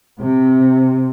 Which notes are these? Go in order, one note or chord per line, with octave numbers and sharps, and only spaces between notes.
C3